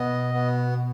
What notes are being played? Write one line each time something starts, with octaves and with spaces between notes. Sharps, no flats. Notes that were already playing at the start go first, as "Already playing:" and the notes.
Already playing: B2 B3 D#5
B3